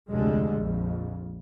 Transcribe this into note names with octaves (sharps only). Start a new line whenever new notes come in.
F1 D2 D3 G3 G#3
A#1 F2